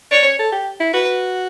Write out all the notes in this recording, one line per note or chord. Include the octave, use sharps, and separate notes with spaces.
C#5 D5
C#5
A4
G4
E4
F#4 B4